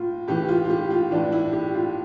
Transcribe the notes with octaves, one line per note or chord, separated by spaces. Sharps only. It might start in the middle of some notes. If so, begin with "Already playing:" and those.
Already playing: A2 F4
A2 E3 G4
F4
F4
G4
F4
A2 E3 D4
E4
G4
F4